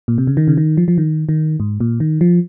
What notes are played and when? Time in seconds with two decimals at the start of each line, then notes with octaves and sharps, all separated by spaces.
0.08 A#2
0.18 C3
0.27 C#3
0.37 D#3
0.48 C#3
0.57 D#3
0.77 F3
0.88 F3
0.98 D#3
1.29 D#3
1.60 G#2
1.80 A#2
2.00 D#3
2.21 F3